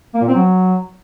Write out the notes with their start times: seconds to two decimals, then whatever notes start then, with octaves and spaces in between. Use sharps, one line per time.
0.14 A#3
0.21 A#2
0.28 C4
0.34 F#3